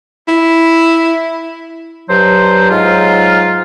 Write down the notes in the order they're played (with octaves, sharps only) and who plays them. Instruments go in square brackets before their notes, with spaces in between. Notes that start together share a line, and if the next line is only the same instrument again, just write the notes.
[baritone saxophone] E4
[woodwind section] G2 F#3 C5
G#2 F#3 F4